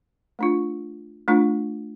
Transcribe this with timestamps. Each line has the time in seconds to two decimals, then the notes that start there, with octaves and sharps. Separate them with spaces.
0.39 A3 D4 F4
1.28 A3 D4 F4